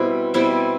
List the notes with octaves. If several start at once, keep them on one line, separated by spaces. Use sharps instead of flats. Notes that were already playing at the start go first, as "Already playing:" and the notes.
Already playing: B2 G3 C4 E4
B2 G3 C4 E4